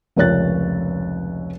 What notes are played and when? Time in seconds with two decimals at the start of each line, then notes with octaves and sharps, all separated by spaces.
0.16 F1 C#2 A#4 C#5 F#6 A6